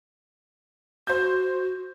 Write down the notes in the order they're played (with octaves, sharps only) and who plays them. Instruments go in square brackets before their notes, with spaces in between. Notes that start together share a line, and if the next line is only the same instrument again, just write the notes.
[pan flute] F#4 [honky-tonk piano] C5 G6